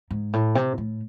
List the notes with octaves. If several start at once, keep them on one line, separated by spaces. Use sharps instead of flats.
G#2
A2
C3
A2